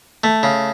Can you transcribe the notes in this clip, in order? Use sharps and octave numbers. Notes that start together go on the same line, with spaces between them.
A3
C#3